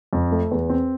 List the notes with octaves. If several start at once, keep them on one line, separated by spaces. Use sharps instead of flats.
F2
A3
E2
C4